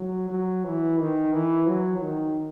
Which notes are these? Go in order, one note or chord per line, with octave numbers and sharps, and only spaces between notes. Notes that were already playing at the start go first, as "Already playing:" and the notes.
Already playing: F#3
F#3
E3
D#3
E3
F#3
D#3